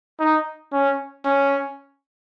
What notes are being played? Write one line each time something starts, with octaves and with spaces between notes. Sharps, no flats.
D#4
C#4
C#4